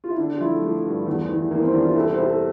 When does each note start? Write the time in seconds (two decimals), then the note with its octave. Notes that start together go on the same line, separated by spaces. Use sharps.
0.04 F4
0.10 E4
0.18 D3 D4
0.29 D4
0.37 F4
0.40 F3 E4
0.52 A3
0.62 F3
0.85 G2
1.07 E2
1.29 E3
1.51 E3 A#3
1.63 C4
1.74 E2 D4
1.84 F4
1.96 C2 A4
2.10 C5
2.18 C2
2.26 A4